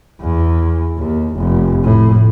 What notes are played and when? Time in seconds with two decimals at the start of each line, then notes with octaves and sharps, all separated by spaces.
0.21 E2
0.97 D#2
1.36 F1
1.83 A2